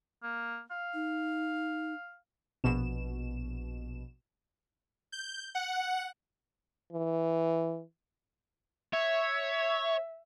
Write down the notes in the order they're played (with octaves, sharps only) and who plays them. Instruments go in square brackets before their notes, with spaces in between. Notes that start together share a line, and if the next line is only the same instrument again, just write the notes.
[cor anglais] A#3
F5
[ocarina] D#4
[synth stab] A#1 B2 E7
[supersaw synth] G6
F#5
[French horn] E3
[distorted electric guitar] C#5 [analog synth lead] E5